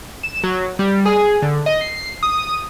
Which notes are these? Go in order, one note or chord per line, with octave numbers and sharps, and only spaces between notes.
E7
F#3
G3
G#4
D3
D#5
C7
D#6